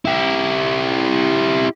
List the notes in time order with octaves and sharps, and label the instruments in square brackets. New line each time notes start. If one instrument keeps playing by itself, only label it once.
[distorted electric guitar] E4 G4